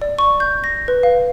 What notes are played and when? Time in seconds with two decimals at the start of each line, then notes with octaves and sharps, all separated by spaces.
0.02 D5
0.19 C#6
0.40 G6
0.64 A#6
0.88 B4
1.03 F5